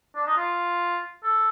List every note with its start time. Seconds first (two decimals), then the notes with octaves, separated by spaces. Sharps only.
0.16 D4
0.27 D#4
0.37 F4
1.23 A4